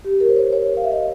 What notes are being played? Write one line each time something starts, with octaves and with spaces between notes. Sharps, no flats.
G4
A#4
C5
C#5
C#5
F5
E5
D#5